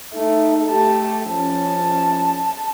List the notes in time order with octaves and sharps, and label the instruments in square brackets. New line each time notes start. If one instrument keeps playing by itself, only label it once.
[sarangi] A3 [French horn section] D#4
[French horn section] A3 G4 [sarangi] A5
[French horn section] F3 C#4 [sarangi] A5